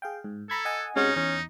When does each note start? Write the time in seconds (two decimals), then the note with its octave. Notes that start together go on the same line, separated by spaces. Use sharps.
0.02 G#4 F5 G5
0.24 G#2
0.50 A4 A#5 B5 G#6
0.65 D#5 F#5 G#5
0.96 C3 G#3 C#4 D#4 F#4
1.16 E2 C#4